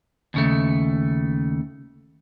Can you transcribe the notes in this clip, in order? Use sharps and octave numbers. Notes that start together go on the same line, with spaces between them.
D#2 C#3 A3